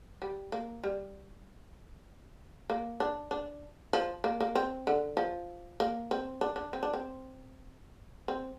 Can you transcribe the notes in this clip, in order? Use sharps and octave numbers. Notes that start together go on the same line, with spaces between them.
G3
A#3
G3
A#3
D4
D4
F3
A#3
A#3
C4
D3
F3
A#3
C4
D4
D4
C4
D4
C4
C4